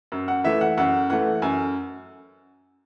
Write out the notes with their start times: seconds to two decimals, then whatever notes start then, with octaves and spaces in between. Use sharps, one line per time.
0.12 F#2
0.28 F#5
0.44 E3 A3 E5
0.61 F#5
0.78 F#2 F#5
1.10 E3 A3 F#5
1.42 F#2 G#5